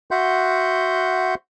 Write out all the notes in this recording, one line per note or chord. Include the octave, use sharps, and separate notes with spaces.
F#4 E5 F#5 C6 G6